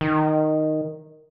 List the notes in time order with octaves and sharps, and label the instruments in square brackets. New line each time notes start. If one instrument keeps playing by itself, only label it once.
[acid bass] D#3